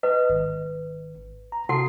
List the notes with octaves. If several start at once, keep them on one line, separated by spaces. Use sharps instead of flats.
B4 D#5
G#1
A#5
C3 F#4 A4 F#5 C6 C7